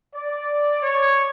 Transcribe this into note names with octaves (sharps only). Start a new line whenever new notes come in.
D5
C#5